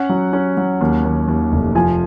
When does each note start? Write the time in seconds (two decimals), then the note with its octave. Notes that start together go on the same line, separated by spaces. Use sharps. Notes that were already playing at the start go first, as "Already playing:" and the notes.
Already playing: C#4 F#5
0.10 F#3
0.33 C#4
0.57 F#3
0.81 D#2
1.04 D#2
1.28 D#2
1.52 F1
1.75 F3 G#5